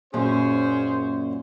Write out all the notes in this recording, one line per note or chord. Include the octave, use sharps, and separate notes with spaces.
F#2 A#2 C#4 G#4 C5